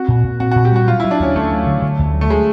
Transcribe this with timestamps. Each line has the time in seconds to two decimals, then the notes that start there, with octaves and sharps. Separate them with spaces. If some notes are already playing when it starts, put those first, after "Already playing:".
Already playing: C4 F#4
0.08 A#2
0.24 A#2
0.40 C4 F#4
0.52 A#2 F#4
0.65 G4
0.72 G3 F#4
0.87 F#3 F4
1.00 F#3 E4
1.11 D4
1.20 D2 C#4
1.35 D2 A3
1.52 F#3
1.67 D3
1.82 D3
1.99 D2
2.14 F#3
2.21 A3
2.30 G#3